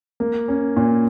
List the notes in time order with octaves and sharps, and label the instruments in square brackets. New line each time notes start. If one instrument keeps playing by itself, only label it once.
[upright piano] A#3
C#4
A#2